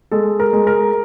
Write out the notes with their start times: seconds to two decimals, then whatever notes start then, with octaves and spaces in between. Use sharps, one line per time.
0.11 G#3 A4
0.40 A#4
0.53 G#3
0.67 A#4